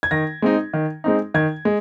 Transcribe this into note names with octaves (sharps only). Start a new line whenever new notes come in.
G#6
D#3 A#6
G#3 C4 D#4
D#3
G#3 C4 D#4
D#3 G#6
G#3